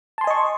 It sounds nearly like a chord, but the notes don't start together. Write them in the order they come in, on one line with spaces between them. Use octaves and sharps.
A5 C6 G#5 D#5 C#6